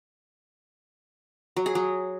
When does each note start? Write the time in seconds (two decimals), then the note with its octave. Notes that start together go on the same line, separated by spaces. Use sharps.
1.57 F#3
1.66 G#4
1.75 F#3